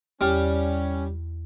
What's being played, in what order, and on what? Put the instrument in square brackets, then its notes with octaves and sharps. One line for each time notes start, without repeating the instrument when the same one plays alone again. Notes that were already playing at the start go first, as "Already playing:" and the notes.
[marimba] E2 F6 [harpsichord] G3 [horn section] C#4